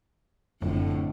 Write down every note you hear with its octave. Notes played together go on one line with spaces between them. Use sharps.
F#1 F2 A2 D3